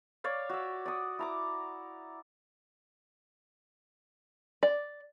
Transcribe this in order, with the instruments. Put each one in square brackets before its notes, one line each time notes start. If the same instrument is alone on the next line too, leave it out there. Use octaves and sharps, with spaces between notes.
[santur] C#5 D5 F5
F#4 E5
D5 F#5 D#6
E4 A#5 D6
[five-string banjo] D5